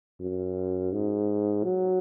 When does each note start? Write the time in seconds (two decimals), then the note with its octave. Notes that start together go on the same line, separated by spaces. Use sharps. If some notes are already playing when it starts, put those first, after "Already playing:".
0.20 F#2
0.92 G#2
1.64 F#3